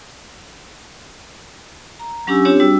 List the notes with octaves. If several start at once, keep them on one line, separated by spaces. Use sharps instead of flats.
A#5
F#3 C#4 D4 G4 G#5 E6
C4 D4 F4 G4 C#5
G3 D4 F#4 E6